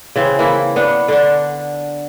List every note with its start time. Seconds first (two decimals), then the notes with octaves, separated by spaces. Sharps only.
0.16 C#3 E3 C4
0.39 E3 A#3 E4
0.76 B3 D4 F#5
1.08 D3 D4